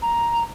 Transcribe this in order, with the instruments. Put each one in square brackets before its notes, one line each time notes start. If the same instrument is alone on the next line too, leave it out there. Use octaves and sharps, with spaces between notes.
[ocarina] A#5